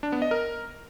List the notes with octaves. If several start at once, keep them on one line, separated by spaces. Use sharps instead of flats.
D4
B3
D#5
A#4